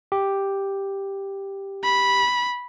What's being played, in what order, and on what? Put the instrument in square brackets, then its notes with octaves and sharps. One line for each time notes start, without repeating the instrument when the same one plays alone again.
[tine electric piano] G4
[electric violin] B5